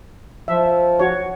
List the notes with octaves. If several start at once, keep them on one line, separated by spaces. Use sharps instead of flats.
F3 E5
F#4 C#5